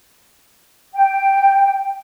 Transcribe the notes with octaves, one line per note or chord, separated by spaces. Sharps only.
G5